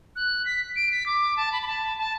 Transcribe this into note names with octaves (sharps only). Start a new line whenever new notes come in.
F#6
B6
D7
B6
D6
A5
B5
B5
A5
A5